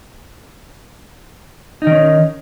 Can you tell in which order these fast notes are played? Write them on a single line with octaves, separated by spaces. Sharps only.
D#4 D#3 C#4